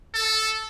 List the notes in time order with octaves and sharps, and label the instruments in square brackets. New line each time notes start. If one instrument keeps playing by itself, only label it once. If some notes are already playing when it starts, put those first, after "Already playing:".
[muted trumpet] A4